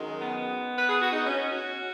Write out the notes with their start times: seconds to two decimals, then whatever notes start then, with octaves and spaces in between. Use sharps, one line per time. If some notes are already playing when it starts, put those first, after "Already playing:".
Already playing: F#2 D#3 G#3
0.21 B3
0.77 B4
0.89 G#4
1.01 F#4
1.13 D#4
1.25 C#4
1.51 F#4